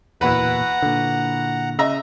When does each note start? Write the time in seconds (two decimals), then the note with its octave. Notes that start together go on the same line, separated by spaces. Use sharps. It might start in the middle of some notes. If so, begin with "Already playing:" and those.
0.21 D1 E2 A#2 E4 F#4 B4 F#5 A#5
0.83 A#2 D3
1.79 C#3 D#5 E5 A#5